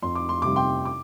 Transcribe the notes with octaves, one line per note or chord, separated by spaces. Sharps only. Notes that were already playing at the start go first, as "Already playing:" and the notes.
F2 C6
D6
C6
C3 G3 D6
G5 C6
D6